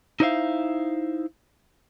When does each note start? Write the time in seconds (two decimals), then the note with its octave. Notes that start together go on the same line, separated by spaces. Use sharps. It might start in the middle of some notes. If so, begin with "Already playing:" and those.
0.20 D#4 E4 C5 C#5 E5 F5